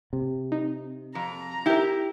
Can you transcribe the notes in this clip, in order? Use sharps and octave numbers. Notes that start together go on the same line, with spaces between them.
C3
D#4
F2 A#5
D#4 E4 G4 A#4